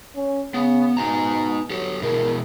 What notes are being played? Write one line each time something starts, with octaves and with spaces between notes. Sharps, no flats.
C#4
C#3 B3
B2 D#4 G#5 A#5
F#3 G4 A4
B2 E4 G#4 A#4